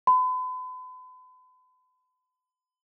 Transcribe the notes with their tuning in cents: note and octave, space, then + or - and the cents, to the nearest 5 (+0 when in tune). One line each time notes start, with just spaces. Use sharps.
B5 +40